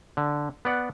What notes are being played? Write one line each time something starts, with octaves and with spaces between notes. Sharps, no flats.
D3
B3 D5 F#5